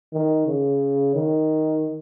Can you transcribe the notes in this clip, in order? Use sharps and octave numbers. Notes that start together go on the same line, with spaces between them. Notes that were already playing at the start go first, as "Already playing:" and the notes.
D#3
C#3
D#3